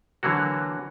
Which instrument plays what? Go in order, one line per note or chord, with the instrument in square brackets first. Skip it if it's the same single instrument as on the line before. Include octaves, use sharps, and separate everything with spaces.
[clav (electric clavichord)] D3 E3 F#3 A#3 F#4